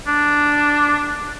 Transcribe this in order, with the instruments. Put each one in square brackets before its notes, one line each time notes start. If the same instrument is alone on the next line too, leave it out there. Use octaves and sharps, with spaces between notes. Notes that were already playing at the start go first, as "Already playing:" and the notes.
[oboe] D4